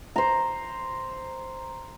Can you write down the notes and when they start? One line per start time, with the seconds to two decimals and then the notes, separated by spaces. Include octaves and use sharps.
0.16 C5 A#5